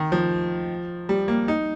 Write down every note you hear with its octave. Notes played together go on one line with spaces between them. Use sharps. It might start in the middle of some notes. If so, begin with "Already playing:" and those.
Already playing: D#3
F3
G3
A#3
D#4